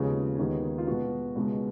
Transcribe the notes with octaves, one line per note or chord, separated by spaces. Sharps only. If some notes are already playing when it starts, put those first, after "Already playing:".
Already playing: D#2 C#3 F3 G#3 B3 G#4
D#2 D#3 G#3 B3
F4
B2 G#3 B3 F#4
C#2 B2 G#3 B3